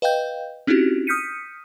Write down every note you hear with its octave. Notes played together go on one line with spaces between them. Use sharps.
B4 D#5 F5 G5 G6
C4 C#4 D#4 E4 F#4 G4
D#6 F6 G6 B6 C#7 D#7